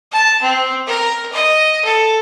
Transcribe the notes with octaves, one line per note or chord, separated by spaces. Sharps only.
A5
C4
A#4
D#5
A4